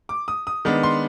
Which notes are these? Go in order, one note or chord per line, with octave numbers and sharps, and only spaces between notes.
D6
D#6
D#6
D#3 G#3 B3 D4
C6